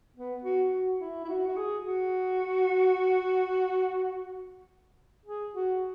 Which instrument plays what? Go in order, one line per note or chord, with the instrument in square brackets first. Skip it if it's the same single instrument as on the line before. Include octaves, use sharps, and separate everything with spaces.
[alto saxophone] B3
F#4
F#4
E4
E4
F#4
F#4
G#4
F#4
G#4
F#4